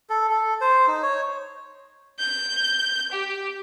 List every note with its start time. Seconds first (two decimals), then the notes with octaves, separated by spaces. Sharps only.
0.10 A4
0.30 A4
0.61 C5
0.88 D#4
1.03 C#5
2.19 G6
3.12 G4